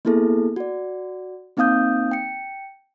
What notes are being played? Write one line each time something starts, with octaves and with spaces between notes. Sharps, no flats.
A#3 B3 E4 G#4 A4
F#4 D5
A#3 C4 D#4 F5 D#6 G6
G5 C#7